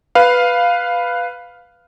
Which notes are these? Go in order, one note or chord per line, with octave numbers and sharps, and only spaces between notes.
B4 F5